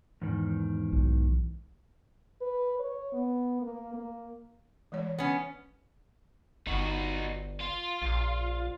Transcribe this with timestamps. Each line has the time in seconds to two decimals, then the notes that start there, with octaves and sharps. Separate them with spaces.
0.22 E2 G#2 D#3
0.92 B1 E3
2.41 B4
2.79 C#5
3.13 B3
3.62 A#3
3.94 A#3
4.92 E3 G#3 C#5
5.18 B3 C#4
6.67 G1 D#4 F#4
7.61 F4
8.02 A#1